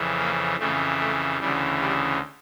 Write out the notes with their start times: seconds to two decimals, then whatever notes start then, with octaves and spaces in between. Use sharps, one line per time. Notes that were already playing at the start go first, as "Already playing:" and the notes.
Already playing: F2 C#3 E3
0.18 A#3
0.58 F2 C#3 E3 A3
1.00 A3
1.40 D2 C#3 E3 G3
1.81 G3